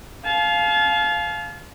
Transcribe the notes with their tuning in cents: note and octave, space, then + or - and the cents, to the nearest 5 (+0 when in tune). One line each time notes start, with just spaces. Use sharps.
F5 +0 A5 -40